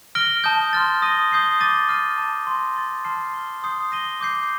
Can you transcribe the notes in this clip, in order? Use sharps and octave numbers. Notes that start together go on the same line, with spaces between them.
F6 A#6 D7 G7
A5 D#6 G6
C6 F6 A6
D#6 A#6 D#7 G7
D#6 G6 C7 G7
D6 A6 D#7 G7
F6 C7 D#7
A5 D6 A6
C6 G6 A#6
C6 D#6 A6
A5 C6 F6 C7
F6 C7 G7
C6 D#6 G6 C7
D#6 A#6 D#7 G7
D6 G6 C7